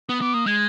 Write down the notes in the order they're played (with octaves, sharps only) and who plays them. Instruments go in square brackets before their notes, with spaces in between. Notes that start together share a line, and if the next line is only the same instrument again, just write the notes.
[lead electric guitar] B3 [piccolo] D#6
[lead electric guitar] B3 [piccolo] D6
[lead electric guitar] A#3 [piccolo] D#6
[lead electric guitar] G#3 [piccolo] G#6